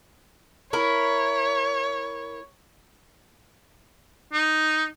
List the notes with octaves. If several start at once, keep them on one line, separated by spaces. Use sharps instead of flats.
E4 A#4 C#5
D#4